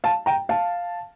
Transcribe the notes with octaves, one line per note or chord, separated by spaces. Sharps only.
F5 A5
G5 A#5
F5 A5